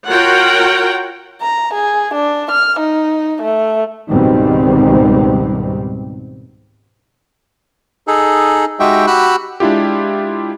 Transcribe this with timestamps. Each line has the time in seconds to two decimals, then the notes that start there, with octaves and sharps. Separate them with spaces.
0.10 F4 F#4 A#4 C#5 F#5 G5
1.42 A#5
1.74 G#4
2.14 D4
2.51 F6
2.80 D#4
3.42 A3
4.09 C#2 G#2 B2 D#3 G3 C4
8.07 D#4 G#4 A4
8.80 G#3 D#4 F#4 G4 E5 G5
9.07 F#4 G4 B5 E6 F#6
9.60 G#3 D4 E4 F4 G4